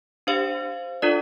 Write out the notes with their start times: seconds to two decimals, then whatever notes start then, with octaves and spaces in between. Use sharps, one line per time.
0.27 D4 G4 C5 F5
1.02 D4 F4 A4 D5